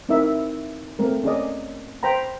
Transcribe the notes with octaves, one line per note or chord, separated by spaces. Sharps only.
C4 D#4 E4 A#4 E5
A3 A#3 C4 A#4
C#4 G#4 D5 D#5
C5 G5 A#5 B5